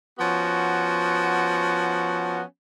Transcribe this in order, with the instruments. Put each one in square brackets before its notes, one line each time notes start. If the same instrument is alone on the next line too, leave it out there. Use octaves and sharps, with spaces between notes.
[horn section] F3 B3 C#4 F#4